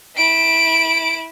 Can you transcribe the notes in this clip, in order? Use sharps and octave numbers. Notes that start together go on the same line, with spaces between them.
E4 D7